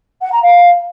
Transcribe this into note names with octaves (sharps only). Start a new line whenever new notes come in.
F#5
A#5
F5